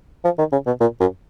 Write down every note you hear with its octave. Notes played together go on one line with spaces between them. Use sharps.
F3
D#3
C#3
B2
A#2
F#2